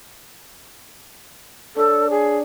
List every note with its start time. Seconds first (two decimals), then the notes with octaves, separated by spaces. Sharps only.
1.76 D4 A4 C#5
2.10 G#4